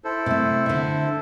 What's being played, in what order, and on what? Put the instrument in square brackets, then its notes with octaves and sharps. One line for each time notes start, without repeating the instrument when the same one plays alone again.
[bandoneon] E4 A4 C5
[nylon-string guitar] C3 A3
D3 E5